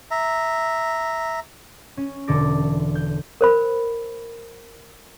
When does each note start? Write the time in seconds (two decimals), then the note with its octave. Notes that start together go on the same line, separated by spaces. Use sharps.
0.11 E5 A#5
1.97 C#4
2.28 E1 D3 A4 D6 A#6
2.95 G6
3.41 A#4 C5 B5